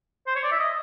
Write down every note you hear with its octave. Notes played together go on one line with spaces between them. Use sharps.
C5
C#5
D5
E5
D#5